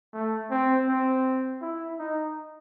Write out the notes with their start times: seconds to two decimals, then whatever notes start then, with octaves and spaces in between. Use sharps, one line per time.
0.14 A3
0.51 C4
0.88 C4
1.62 E4
1.99 D#4